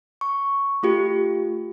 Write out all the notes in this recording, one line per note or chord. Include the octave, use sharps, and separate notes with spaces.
C#6
A3 F4 G4